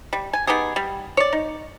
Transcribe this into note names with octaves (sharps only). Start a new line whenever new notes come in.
G3
G#5
B3 D#4 G4 G#4
G3
C#5 D5
D#4